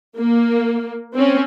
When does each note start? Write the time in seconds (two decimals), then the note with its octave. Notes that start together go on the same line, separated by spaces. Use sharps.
0.19 A#3
1.14 C4 C#4